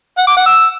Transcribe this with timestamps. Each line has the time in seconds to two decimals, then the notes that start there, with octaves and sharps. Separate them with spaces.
0.18 F#5
0.27 D6
0.37 F#5
0.46 E6